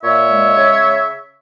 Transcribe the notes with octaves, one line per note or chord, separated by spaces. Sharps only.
A#2 C#5 E5
G#3
C#3